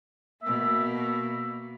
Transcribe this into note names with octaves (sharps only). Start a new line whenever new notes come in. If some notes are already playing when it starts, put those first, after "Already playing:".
B2 A#3 E5